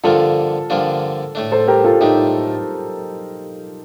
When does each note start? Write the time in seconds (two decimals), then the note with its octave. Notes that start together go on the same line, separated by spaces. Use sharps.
0.04 G2 D3 F3 A#3 D4 F4 A4
0.70 G2 D3 F3 A#3 D4
1.35 A2 A3 D4
1.52 A4 C5
1.68 G4 A#4
1.84 F4 A4
2.00 A2 A3 D4 D#4 G4